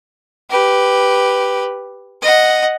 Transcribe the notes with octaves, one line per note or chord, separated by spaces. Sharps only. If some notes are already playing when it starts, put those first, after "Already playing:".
G4 B4
D#5 F#5